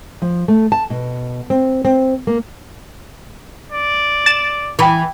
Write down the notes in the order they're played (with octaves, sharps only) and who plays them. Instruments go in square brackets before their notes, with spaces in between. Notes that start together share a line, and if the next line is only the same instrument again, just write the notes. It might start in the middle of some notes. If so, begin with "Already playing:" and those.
[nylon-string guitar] F3
A3
A5
B2
C4
C4
A#3
[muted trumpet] D5
[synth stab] A6 E7
[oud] E3 [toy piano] G5 B5 D#6